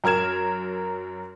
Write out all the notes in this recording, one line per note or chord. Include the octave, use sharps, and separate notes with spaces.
F#2 A#4 F6 G#6 E7